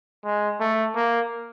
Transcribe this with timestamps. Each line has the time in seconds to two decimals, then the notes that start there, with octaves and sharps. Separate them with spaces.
0.25 G#3
0.60 A3
0.96 A#3